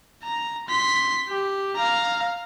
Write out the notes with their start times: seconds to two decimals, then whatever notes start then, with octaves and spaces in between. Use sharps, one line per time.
0.23 A#5
0.69 C6 B6
1.29 G4
1.76 F5 A#5